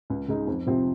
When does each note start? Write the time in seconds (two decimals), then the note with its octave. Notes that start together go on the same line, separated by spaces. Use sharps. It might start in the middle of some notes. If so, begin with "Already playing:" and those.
0.10 C#2
0.28 C#3 G#3 D#4
0.47 F2
0.67 C3 F3 C4